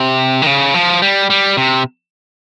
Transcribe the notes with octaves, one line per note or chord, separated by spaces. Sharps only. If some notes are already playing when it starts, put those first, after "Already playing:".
Already playing: C3
D#3
C#3
F3
G3
G3
C3